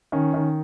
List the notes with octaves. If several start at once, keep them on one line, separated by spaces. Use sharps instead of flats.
D#3 C#4
D#3